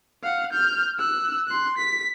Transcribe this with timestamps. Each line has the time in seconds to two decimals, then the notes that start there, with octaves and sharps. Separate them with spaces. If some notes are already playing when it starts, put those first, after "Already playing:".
0.23 F5 F#5
0.53 F6 G6
0.99 E6 F#6
1.48 C6 F#6
1.78 B6